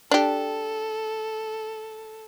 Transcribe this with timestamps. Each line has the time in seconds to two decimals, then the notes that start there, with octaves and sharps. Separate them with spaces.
0.11 D4 G4 A4